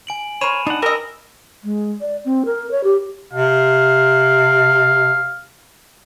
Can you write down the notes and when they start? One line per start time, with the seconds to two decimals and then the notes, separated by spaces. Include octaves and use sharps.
0.07 G#5 D7 F#7
0.41 A#4 C5 C#5 B5 D#7 E7
0.67 D4 D#4 F#5
0.82 G4 A#4 D#5 E5 E6
1.64 G#3
2.01 D5
2.25 C4
2.45 A#4
2.71 C#5
2.84 G4
3.33 C3 F5